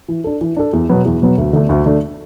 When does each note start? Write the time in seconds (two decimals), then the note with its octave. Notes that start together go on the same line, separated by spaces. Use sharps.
0.08 E3
0.24 D4 A4
0.41 E3
0.56 D4 A4
0.73 E2
0.89 B2 F#3 B3
1.05 E2
1.22 B2 F#3 B3
1.38 D2
1.53 D3 A3 D4
1.69 D2
1.86 D3 A3 D4